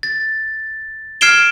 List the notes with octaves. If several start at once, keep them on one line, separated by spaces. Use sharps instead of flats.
A6
F6 G#6 C7 D7 E7 G7